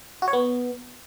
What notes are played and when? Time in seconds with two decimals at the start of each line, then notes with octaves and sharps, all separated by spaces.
0.22 F#4
0.28 C#5
0.33 B3